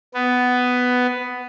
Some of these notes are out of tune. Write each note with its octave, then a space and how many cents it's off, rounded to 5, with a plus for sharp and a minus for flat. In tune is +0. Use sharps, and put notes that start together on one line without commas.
B3 +10